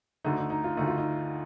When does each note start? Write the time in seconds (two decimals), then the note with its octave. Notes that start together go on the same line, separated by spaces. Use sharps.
0.24 D2 D3 A3 D#4
0.38 D#4
0.50 D#4
0.64 F4
0.77 D2 D3 A3 D#4
0.87 F4
0.98 D#4